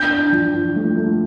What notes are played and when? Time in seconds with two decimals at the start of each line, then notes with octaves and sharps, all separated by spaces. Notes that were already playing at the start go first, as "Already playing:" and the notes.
Already playing: D4 G6
0.11 D4
0.32 F3
0.54 F3
0.76 A3
0.97 A3